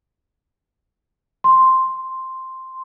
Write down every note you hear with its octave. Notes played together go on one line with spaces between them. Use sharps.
C6